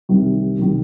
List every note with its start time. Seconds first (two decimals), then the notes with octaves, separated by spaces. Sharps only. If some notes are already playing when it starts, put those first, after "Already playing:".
0.09 C2 C3 D#3 G3
0.58 C2 C3 D#3 G3